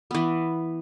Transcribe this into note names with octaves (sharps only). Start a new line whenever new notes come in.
E3 B3